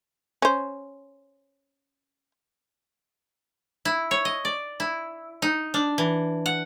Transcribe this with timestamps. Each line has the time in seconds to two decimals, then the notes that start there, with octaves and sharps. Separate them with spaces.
0.42 C#4 C5
3.85 E4
4.11 C#5
4.25 D#5
4.45 D5
4.80 E4
5.42 D#4
5.74 D4
5.98 E3
6.46 F#5